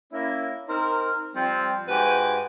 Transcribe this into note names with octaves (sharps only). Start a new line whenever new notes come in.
A#3 C#4 E4
C4 D#4 A#4
F3 G3 C4
G#2 F#4 G4 B4 G#5